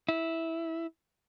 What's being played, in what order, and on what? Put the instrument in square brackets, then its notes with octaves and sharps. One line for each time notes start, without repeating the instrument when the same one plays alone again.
[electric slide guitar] E4